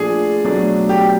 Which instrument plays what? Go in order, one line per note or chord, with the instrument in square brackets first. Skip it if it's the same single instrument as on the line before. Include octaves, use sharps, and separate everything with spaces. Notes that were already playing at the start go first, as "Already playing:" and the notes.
Already playing: [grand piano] A#2 F3 A3 D4 G#4
B2 F#3 A3 D4
G4